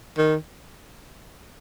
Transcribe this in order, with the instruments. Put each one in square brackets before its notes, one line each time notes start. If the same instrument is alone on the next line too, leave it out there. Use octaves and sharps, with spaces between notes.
[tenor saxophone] D#3